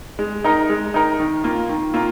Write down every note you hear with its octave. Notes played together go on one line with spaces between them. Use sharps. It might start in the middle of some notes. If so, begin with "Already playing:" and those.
G#3
D#4 A#4
G#3
D#4 A#4
D#3
A#3 F4
D#3
A#3 F4